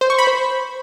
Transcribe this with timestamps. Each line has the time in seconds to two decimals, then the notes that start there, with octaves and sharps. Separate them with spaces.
0.01 C5
0.10 C#6
0.18 B5
0.27 C5